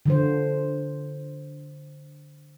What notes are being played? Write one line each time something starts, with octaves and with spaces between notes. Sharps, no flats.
D3 F3 C5